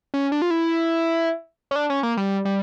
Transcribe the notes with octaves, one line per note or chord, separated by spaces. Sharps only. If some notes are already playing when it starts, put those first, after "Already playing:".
C#4
D4
F4
E4
C#4
D4
C#4
A#3
G3
G3